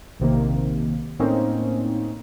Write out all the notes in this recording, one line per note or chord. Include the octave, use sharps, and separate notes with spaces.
A#1 C3 D#3 A#3
A2 A#3 C4 C#4 D#4